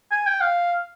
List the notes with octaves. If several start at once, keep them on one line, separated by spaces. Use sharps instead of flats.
G#5
G5
F5